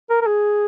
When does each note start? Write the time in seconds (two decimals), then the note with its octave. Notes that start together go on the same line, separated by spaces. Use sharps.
0.10 A#4
0.21 A#4
0.26 G#4